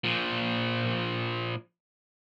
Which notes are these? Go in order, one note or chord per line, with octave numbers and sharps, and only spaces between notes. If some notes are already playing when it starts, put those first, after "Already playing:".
A#2 F3